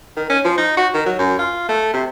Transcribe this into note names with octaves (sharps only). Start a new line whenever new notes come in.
D#3
C#4
F3
D#4
F#4
D#3
F#3
F#2
F4
A3
C3